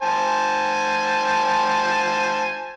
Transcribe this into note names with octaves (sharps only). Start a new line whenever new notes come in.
C5 G#5 A5